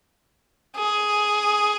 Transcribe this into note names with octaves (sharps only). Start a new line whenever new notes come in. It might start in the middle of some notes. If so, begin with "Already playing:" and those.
G#4